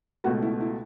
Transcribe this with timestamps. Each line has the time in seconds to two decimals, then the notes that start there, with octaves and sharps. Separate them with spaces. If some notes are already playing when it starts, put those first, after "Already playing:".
0.24 C#2 B2 A3 F#4
0.42 E4
0.61 E4